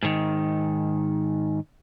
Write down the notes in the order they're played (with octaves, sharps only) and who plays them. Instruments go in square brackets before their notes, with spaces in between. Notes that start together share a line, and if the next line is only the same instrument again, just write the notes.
[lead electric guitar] G#2 D#3